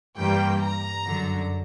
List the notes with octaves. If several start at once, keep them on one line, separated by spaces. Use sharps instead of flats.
G2 E3 G3 A#3 G5
A#5
F#2 D3 F#3